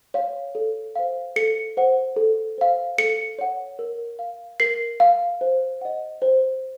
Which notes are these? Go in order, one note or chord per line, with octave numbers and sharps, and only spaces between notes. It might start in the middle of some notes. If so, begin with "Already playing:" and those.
C#5 F5
A4
C5 F5
A4 C#7
C5 F#5
A4
C5 F5
A4 C#7
C#5 F#5
A#4
F5
A#4 C7
F5
C5
D#5 F#5
C5